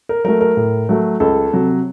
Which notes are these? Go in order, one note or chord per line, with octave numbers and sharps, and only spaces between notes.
A#4
F#3 A3 A#4
A#4
A2
F#3 A3
C#2 A4
C3 F#3